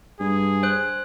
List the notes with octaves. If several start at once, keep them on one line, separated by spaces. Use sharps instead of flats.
G2 G#4
C5 F#6